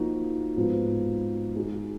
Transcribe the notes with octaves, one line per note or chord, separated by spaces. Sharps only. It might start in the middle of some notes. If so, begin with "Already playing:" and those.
Already playing: F3 A#3 D#4 F#4
G#2 F3 B3 D#4
G#3 D#4 F#4